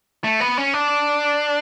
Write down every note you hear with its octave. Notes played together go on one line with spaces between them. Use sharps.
A3
B3
C#4
D4